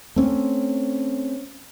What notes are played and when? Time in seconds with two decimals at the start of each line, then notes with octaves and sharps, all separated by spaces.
0.16 A3 C4 C#4